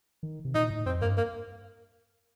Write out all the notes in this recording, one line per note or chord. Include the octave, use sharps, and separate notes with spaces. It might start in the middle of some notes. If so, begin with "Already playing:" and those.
D#3
C3
A#2 D#4
A2
F2 C4
G2 A#3
A#3